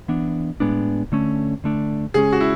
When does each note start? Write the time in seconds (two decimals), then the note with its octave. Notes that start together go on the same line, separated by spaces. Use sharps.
0.08 E3 B3 D4
0.60 A2 G#3 B3 D4
1.12 D3 A3 C#4
1.64 D3 A3 D4
2.14 C#3 G#3 C#4 G#4
2.33 F#4
2.40 E4